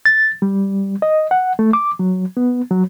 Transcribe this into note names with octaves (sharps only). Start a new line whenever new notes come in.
A6
G3
D#5
F#5
A3
D6
F#3
B3
F#3